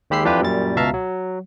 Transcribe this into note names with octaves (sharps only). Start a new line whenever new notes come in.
D#2 G#3 G4 B5 E6 C7
F2 E3 D4 F4 G4 B4
F#2 A#2 G3 A6
C#2 B2 E5 F5 A5 A#5
F#3